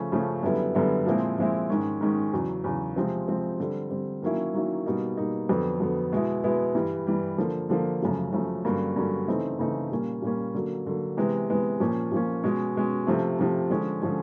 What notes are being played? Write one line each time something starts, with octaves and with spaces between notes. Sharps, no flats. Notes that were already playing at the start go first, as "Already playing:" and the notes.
Already playing: C#3 F3 A3 C#4
C#3 F3 A3 C#4
F#2 D3 G3 B3 E4
F#2 D3 G3 B3 E4
A#2 F3 G#3 C4 E4
A#2 F3 G#3 C4 E4
G#2 D#3 G#3 C#4
G#2 D#3 G#3 C#4
E2 C#3 F#3
E2 C#3 F#3
C3 F3 G#3 C4
C3 F3 G#3 C4
D3 G3 C4
D3 G3 C4
D#3 F#3 A#3 C#4 E4
D#3 F#3 A#3 C#4 E4
B2 G3 A#3 D#4
B2 G3 A#3 D#4
F2 D3 F#3 B3
F2 D3 F#3 B3
B2 G#3 B3 E4
B2 G#3 B3 E4
G2 E3 G3
G2 E3 G3
D3 F3 A#3
D3 F3 A#3
F#2 C#3 F3 A3
F#2 C#3 F3 A3
G2 D3 F#3 A#3 C#4
G2 D3 F#3 A#3 C#4
C#3 E3 A3 C4 D#4
C#3 E3 A3 C4 D#4
A#2 G3 A#3 C#4
A#2 G3 A#3 C#4
D3 F#3 A#3
D3 F#3 A#3
C3 E3 G#3 B3
C3 E3 G#3 B3
A#2 F3 A#3 C#4
A#2 F3 A#3 C#4
B2 G#3 C#4
B2 G#3 C#4
C3 F3 A3
C3 F3 A3
D3 F3 G#3 C#4
D3 F3 G#3 C#4